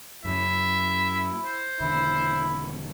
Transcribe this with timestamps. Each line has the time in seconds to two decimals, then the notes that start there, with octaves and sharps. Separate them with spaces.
0.25 F#2 C#3 F#3 E4 E5
1.45 C5
1.80 E1 D3 D#3 E4